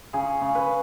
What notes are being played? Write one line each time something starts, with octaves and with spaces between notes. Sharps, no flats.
C#3 G#4
C#3
B4